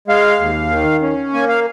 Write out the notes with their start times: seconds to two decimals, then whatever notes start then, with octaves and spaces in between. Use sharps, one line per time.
0.08 G#3 F5
0.40 D#2
0.70 D#3
1.02 C#4
1.33 A#3 G#5
1.49 F5